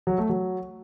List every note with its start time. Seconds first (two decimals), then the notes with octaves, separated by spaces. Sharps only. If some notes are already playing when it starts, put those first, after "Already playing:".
0.07 F#3
0.18 A3
0.29 F#3